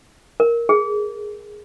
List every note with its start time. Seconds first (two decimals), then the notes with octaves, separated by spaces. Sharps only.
0.40 A#4
0.69 G#4